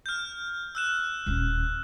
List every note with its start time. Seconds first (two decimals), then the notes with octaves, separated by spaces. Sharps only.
0.06 F6 G6
0.75 E6 F#6 E7
1.27 D#1 C#4